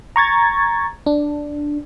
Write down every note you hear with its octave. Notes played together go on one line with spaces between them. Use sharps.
A#5 C#6 G#6 A6
D4